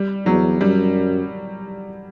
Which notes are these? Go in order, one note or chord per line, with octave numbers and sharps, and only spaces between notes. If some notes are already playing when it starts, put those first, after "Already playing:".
Already playing: G3
E2 F#3
F#2 G3